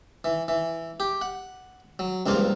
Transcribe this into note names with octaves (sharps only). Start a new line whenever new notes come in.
E3
E3
G4
F#5
F#3
C#2 G2 F3 A#3 F4